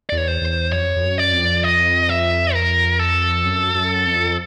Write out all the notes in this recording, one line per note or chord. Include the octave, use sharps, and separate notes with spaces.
E2 D5
C#5
C5
E2
F2 C#5
F2
F#2
D5
F2
D#5
E5
A#4
A4
F#2
F#2
F2